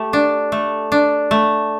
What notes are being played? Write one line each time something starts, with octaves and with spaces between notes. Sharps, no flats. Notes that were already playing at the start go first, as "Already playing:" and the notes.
Already playing: A3 G4
D4
A3
D4
A3